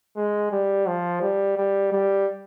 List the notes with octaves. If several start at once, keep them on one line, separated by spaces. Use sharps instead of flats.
G#3
G3
F3
G3
G3
G3